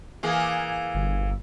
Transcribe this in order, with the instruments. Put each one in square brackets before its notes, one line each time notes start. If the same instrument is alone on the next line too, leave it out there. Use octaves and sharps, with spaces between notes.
[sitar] E3 A#3 G#4
[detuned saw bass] G1